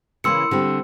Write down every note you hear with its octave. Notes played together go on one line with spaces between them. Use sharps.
C#3 E3 A#3 C6 E6 C#7
D3 G3 C4